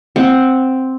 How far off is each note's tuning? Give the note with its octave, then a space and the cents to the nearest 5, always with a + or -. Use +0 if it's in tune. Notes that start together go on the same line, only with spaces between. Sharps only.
C4 +0 F#5 +0